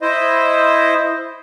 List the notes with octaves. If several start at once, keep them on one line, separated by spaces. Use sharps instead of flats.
E4 C5 D#5